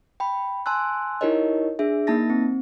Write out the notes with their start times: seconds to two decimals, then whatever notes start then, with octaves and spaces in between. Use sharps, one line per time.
0.20 G5 B5
0.66 G#5 A5 C6 E6 F#6
1.21 D#4 E4 G4 A#4 C#5 D#5
1.79 D4 G#4 E5
2.07 A#3 D#4 A5 A6 A#6
2.30 C4